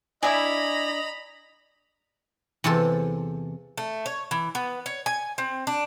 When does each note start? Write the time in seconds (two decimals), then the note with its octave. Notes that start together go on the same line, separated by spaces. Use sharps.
0.23 D4 E4 D5 D#5 G#5 A#5 B5
2.64 E2 C3 F4 A4
3.78 A3
4.06 C#5
4.31 E3
4.55 B3
4.86 C#5
5.06 G#5
5.38 C4
5.67 D4